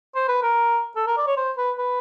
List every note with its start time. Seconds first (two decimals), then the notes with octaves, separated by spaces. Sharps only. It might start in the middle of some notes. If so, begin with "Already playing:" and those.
0.15 C5
0.28 B4
0.43 A#4
0.96 A4
1.07 A#4
1.17 D5
1.27 C#5
1.37 C5
1.57 B4
1.78 B4